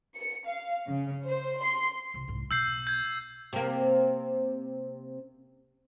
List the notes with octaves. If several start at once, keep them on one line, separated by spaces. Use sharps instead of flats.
C#7
F5
C#3
C5
C6
C2
C2 G#2
B1 B2 E6 G6 C7
G6 G#6
C3 A#3